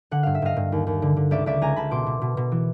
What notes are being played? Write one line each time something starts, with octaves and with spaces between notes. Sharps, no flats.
D3 F#5
G2 F5
E5
G2 D#5 F5
G2
D#2
D#2
D3
D3
C#2 D5 E5
C#2 D5 E5
C#2 G#5 A#5
C#2 A5 B5
B2 C6 D6
B2
B2
B2
E3